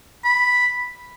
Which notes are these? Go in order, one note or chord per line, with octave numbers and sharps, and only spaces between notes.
B5